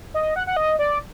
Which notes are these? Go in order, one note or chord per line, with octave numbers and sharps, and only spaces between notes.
D#5
F#5
F#5
D#5
D5